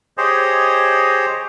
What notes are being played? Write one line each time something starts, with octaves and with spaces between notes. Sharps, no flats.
G4 G#4 C5 C#5 D#5